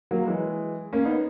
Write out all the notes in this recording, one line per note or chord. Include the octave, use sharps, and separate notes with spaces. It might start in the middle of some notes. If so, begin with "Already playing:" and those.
F#3 A#3
E3 G#3
A#3 C#4
B3 D#4